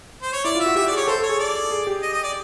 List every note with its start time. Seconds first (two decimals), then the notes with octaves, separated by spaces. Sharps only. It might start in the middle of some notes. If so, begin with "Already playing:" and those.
0.22 C5
0.33 C#5
0.44 E4 D5
0.55 F4
0.60 E5
0.66 F#4
0.76 G4 E5
0.87 D5
0.92 G#4
0.97 C#5
1.07 A4 C5
1.18 A4
1.23 C#5
1.29 G#4
1.39 D5
1.71 G#4
1.87 G4
2.02 D#5
2.13 D#5
2.23 D5